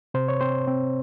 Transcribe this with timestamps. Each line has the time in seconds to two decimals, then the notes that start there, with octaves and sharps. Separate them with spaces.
0.14 C3 C5
0.28 C#5
0.41 C4 C5
0.68 C4